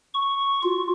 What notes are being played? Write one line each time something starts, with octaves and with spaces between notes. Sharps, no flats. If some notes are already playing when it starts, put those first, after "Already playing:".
C#6
F4 F#4